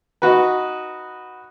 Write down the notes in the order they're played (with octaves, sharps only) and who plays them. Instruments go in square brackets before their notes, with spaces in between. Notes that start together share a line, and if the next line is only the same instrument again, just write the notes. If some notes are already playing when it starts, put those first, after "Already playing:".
[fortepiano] D#4 F#4 B4